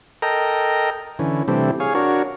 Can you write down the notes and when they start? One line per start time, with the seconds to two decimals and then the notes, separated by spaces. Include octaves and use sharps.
0.22 A4 A#4 D#5 G5 A#5
1.19 D3 E3 C#4
1.48 C3 E3 G3 A3 C4 D4
1.80 G#4 C#5 F5
1.95 D4 F#4 A#4 C#5